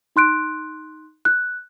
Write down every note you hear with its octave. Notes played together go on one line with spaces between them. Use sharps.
D#4 C6 F#6 D7
F#6